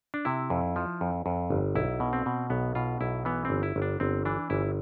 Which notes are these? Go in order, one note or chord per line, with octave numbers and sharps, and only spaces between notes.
D4
C3 E4
F2
F3
F2
F2
G1
B1 E4
B2
C4
B2
B1 B3
B2 F4
B1 E4
E3 B3
C4
G1
E4
G1
D4
G1 C4
E3 D4
G1 E4